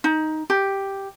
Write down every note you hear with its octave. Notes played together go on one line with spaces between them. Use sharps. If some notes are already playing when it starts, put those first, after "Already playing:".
D#4
G4